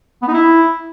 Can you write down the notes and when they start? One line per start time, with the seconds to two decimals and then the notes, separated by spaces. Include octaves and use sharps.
0.22 B3
0.28 D#4
0.33 E4